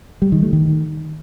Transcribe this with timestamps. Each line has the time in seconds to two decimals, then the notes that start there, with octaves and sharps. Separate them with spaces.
0.22 G3
0.32 D#3
0.42 A3
0.53 D#3